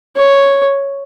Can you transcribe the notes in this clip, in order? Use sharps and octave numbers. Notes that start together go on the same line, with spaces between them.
C#5